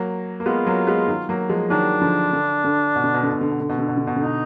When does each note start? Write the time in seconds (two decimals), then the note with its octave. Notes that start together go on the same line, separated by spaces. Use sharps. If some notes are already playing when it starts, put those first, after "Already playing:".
Already playing: F#3 A#3
0.40 A#3
0.46 G#3 B3 F4
0.66 F#3 A#3
0.87 G#3 B3
1.08 D#3 F#3
1.29 F#3 A#3
1.49 F3 G#3
1.70 D#3 F#3 D4
2.01 D3 F3
2.33 D3
2.64 D3
2.96 B2
3.04 D3
3.14 B2
3.23 D3
3.32 B2
3.41 D3
3.51 B2
3.60 D3
3.69 B2
3.79 D3
3.88 B2
3.97 D3
4.07 B2
4.16 D3 D#4
4.25 B2